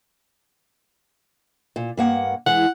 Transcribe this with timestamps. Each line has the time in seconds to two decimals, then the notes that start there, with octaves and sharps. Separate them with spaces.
1.76 A#2
1.97 G2 A#3 F#5
2.46 E3 G#3 F#5